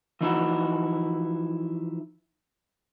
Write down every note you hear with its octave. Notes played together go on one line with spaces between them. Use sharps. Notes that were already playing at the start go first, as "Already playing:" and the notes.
E3 F3 D#4 E4 F#4